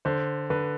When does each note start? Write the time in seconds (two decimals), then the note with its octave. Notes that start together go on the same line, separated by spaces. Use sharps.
0.05 D3 C5
0.50 D3 B4